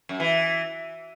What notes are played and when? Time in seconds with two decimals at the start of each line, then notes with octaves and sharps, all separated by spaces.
0.09 F#2
0.20 E3